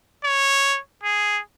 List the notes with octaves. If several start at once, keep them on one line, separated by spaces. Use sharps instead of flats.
C#5
G#4